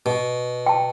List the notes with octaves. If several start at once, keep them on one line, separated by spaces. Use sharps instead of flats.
B2
G5 A5